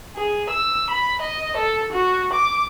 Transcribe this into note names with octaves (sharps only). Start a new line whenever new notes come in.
G#4
E6
B5
D#5
A4
F#4
D6